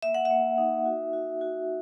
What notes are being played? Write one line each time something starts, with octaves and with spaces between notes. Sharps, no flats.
A#3 E5
F#5
A#3 E5
D#4
F#4
F#4
F#4